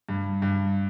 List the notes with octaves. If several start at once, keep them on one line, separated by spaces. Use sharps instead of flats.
G2
G2